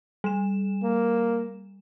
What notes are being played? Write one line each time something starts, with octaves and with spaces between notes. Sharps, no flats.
G3 E7
A#3